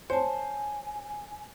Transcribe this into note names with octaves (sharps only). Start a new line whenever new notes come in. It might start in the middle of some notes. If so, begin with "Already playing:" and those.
C5 C#5 G#5 A5